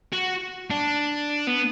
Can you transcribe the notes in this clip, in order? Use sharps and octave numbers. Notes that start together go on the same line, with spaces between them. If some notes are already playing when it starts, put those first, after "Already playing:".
F#4
D4
B3